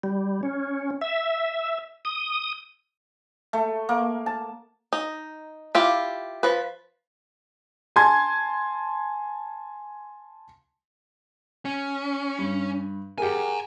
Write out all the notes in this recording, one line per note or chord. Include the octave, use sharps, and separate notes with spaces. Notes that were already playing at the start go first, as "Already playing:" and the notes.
G3
C#4
E5
D#6
A3
A#3
A5
D#4
E4 F4 G4
F3 B4
G#5 A5 C6 G#6
C#4
G2
G4 G#4 A#4 F#5 G#5